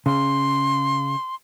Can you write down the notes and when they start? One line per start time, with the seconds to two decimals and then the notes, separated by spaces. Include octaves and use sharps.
0.06 C#3 C6